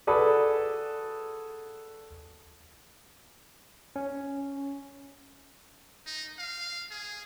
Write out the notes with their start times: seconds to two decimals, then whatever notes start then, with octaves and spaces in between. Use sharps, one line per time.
0.07 F#4 G#4 A4 B4 D5
3.96 C#4
6.07 D#4
6.39 F5
6.91 G#4